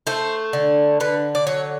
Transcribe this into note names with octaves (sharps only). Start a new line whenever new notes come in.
A3 C5
D3
D3 B4
D5
F#3 C#5